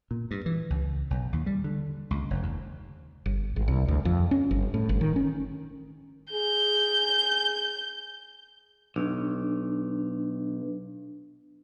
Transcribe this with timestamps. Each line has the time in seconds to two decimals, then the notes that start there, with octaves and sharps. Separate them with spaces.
0.11 A#2
0.31 G2
0.46 E3
0.70 C#2
1.10 B1
1.32 D#2
1.46 G3
1.64 D3
2.11 C#2
2.30 F1
2.43 D#2
3.26 G1
3.56 G#1
3.68 C2
3.88 D2
4.05 F2
4.31 C#4
4.51 G1
4.74 A2
4.89 G1
5.01 D#3
5.16 C#4
6.33 G#4 G6
8.96 B1 D4